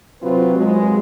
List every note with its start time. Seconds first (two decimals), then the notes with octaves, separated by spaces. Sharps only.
0.20 C3 F#3 C4 F4 B4
0.56 D#2 F#3 G#3